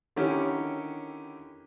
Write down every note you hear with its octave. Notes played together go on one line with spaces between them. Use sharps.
D3 D#3 C#4 E4 G4